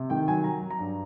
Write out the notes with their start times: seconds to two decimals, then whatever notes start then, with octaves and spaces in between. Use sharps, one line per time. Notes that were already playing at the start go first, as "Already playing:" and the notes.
Already playing: C3
0.10 D#3 G5
0.28 F#3 G#5
0.44 F#3 A#5
0.62 F#3
0.71 A#5
0.79 G2